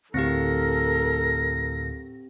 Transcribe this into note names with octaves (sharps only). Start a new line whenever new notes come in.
D2 A2 C4 G4 A4 A#4 F5 A#6